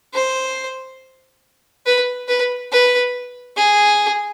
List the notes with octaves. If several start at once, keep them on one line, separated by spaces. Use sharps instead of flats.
C5
B4
B4
B4
G#4